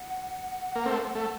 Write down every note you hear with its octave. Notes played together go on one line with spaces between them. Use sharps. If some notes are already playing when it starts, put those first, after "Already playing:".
Already playing: F#5
A#3
A3 C4
A3